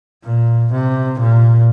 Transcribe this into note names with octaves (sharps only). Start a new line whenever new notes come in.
A#2
C3
A#2